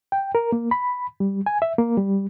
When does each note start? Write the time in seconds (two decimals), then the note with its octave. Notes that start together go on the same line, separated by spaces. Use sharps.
0.12 G5
0.35 A#4
0.52 A#3
0.71 B5
1.20 G3
1.46 G#5
1.62 E5
1.78 A#3
1.98 G3